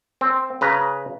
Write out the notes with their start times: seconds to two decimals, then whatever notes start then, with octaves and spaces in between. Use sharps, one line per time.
0.21 C4
0.61 C#3 B4 A#5